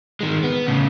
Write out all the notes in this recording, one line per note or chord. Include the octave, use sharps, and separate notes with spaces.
D#3 G#3
B3
A2 C#3